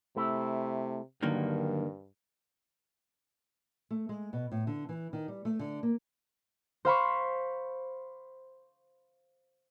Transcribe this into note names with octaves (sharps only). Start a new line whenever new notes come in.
C3 A3 E4
G2 D3 D#3 F#3 A#3
A3
G#3
B2
A2
D3
E3
D#3
G3
A3
D3
A#3
C5 F5 B5 C#6